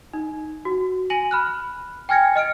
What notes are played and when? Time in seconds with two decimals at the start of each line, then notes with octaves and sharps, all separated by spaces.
0.13 D#4
0.65 F#4
1.10 G#5 A#6 D#7 F#7
1.31 B5 F6 F#6
2.09 G5 G#5 F6 G#6 A#6 C#7
2.36 D#5 F6 C#7 D7